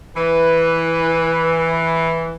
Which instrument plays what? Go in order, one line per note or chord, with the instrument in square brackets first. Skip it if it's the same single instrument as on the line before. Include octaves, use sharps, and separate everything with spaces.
[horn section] E3 [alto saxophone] B4